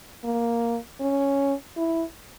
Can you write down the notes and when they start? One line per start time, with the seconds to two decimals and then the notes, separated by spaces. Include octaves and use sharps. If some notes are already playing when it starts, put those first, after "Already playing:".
0.24 A#3
1.01 C#4
1.77 E4